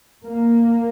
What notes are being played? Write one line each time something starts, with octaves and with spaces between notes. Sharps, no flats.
A#3